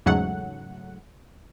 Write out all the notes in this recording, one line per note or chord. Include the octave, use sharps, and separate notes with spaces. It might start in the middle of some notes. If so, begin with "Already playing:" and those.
E2 G#2 C#3 F#3 A3 F#5